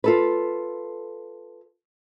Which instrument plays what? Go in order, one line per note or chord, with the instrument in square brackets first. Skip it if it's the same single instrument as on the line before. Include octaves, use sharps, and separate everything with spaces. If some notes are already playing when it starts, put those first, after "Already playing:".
[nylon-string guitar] F4 A4 B4